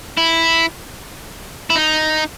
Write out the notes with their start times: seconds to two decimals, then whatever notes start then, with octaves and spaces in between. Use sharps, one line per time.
0.17 E4
1.70 E4
1.76 D#4